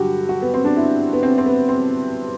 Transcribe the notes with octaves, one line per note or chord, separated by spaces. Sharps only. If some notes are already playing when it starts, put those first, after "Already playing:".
Already playing: G2 D3 F#3 F#4 G4
F#4
B3
C4
D4
E4
B3
C4
C4
B3
C4